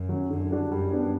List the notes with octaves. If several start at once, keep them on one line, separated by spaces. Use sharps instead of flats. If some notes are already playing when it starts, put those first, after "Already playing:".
Already playing: F#2
F#3 C#4
F#2 D3
G3 D4 F#4
F#2 G3
B3 D4 G4